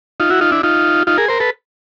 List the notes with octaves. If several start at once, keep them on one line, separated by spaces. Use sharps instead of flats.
D#4 F4
E4 F#4
D#4 F4
D4 E4
D#4 F4
D#4 F4
G#4 A#4
A#4 C5
A4 B4